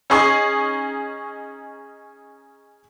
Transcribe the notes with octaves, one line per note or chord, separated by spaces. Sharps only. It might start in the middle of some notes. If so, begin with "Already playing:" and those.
C#4 D#4 G#4 C#6 D#6